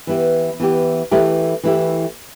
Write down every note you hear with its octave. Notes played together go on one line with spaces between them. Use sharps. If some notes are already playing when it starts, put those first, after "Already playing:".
E3 B3 E4 G4
E3 B3 E4 G4
E3 A3 E4 G4
E3 A3 E4 G4